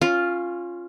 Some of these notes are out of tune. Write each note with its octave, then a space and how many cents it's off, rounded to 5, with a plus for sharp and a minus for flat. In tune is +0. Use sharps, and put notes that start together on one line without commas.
C#4 -15 F4 +0